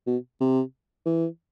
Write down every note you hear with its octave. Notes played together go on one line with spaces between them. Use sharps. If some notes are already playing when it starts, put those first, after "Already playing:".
B2
C3
E3